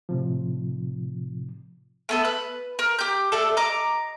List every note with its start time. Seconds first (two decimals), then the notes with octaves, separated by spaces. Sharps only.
0.09 A2 C3 F3
2.09 A3 B3 A4
2.25 B4 F#6
2.79 A#4
2.99 G4 G6
3.32 A3 D4 A4
3.57 D#5 A#5 D6